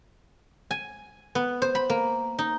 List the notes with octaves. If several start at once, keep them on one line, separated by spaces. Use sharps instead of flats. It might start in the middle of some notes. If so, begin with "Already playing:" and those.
G#5
B3
C5
B5
A#3
D#4